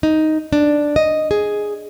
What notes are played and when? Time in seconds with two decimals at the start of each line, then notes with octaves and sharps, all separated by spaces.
0.03 D#4
0.53 D4
0.96 D#5
1.31 G#4